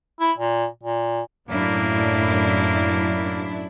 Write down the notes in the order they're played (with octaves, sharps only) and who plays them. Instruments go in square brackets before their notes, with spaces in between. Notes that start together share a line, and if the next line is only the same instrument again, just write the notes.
[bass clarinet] E4
A#2
A#2
[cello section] F#2 D4 E4 [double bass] A2 [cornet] A#3